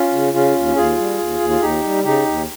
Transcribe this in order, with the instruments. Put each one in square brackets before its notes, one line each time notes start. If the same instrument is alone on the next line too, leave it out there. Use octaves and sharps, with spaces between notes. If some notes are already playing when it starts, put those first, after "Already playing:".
Already playing: [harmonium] C#4 F4
C#3
C#3 C#4 F4
D#2
D#2 F4 G#4
G3
D#2
D#2
F4
D#2 D#4 G4
G3
C#3 D#4 G4
D#2